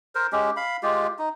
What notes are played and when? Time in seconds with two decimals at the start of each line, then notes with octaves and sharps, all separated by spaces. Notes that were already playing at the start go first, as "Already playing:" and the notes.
0.15 A#4 C5
0.32 G#3 C#4 G4
0.56 F5 B5
0.83 G#3 F4 G4
1.19 D#4